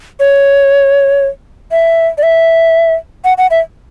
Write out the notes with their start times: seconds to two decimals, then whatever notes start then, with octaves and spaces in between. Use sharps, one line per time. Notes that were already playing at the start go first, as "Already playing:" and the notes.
0.20 C#5
1.71 E5
2.18 D5
2.23 E5
3.25 F#5
3.38 F#5
3.51 E5